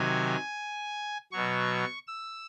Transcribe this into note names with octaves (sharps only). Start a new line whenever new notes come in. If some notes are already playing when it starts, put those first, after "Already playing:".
Already playing: C3 D#3 F#3 G#5
B2 F#3 C#6
E6